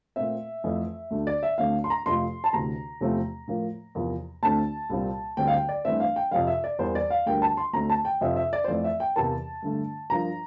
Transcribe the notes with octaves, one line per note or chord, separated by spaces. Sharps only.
A#2 A3 C4 E5
F2 E3 A3
D2 D3 A3
D5
E5
D2 D3 A3 C4 F5
C6
A#5
F2 C3 F3 A3 C6
A5
D2 C3 E3 A#5
E2 C3 F3 A3 C4
A2 F3 A#3
E2 C3 F3 A#3
D2 D3 A3 C4 A5
C2 A#2 G3 C4
D2 D3 G3 C4 G5
F5
G5
D5
G2 E3 A3 C4 E5
F5
G5
F2 C3 F3 F5
E5
D5
E2 E3 G3 A#3 C5
D5
F5
D2 D3 G3 A#3 G5
A5
C6
D2 D3 A3 C4 A#5
A5
G5
F2 C3 F3 C4 E5
E5
D5
C5
F2 E3 A3 C4 D5
E5
G5
E2 C3 E3 A#3 A5
G2 D3 A3
G2 F3 A#3 A#5